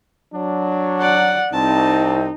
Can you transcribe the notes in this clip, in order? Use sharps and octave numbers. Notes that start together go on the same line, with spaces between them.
F#3 D4
D5 F#5
C2 C4 D#4 A5